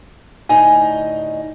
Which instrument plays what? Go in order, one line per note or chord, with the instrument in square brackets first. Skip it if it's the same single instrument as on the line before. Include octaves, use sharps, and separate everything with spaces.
[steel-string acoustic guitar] D2 A2 D#4 [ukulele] G#5